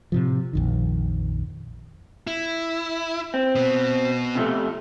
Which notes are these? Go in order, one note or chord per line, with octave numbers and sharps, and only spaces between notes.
A2 C3 F3
A#1 F2 D#3
E4
C4
B2 B3
C3 F3 A3